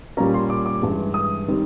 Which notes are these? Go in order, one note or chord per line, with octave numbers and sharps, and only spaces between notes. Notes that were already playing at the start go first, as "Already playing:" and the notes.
A#2 G3 A#3 C#4 A#5
C6
D6
D6
G2 E3 G#3 C#4
D#6
D#3 G3 C4